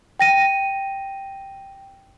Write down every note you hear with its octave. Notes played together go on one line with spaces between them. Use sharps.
G5 A#6 D#7